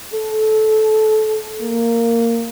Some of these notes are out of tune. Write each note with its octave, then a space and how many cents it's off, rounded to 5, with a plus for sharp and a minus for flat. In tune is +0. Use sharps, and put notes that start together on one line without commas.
A4 -20
A#3 -10